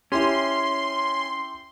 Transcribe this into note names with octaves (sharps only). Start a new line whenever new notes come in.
C#4 E4 G4 C6